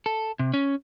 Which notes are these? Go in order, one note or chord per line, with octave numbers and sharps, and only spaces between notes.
A4
C3
C#4